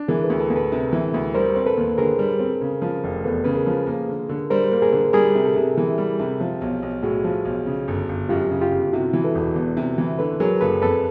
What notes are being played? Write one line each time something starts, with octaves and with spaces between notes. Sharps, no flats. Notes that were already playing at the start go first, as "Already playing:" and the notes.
Already playing: D4
E3 G#4 A#4
A4 B4
D2
A4 B4
D2
A4 B4
C3
E3
D2
G3 A#4 C5
C4
A4 B4
D#2
D3 G#4 A#4
G3
C4
C#3
F3
F1
E2 A4 B4
C#3 B4
G#4 A#4
F3
A#3
D3
D3
G3 A#4 C5
A#3
G#4 A#4
D3
G3 G#4 A#4
C3
G4 A4
C3
E3
G3
C3
F3
B1
B1
A2 F#4 G#4
F3
B1
C#3
G1
G1
F#2 F4 G4
C#3
F4 G4
G1
C3 E4 F#4
E3
A4 B4
E1
E2
C3
E3
D3 A4 B4
F#3 G#4 A#4
F#1 A4 B4
F2 A4 B4